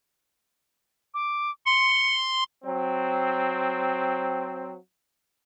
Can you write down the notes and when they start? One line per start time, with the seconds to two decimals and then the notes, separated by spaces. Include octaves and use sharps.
1.14 D6
1.66 C6 C#7
2.64 F#3 C4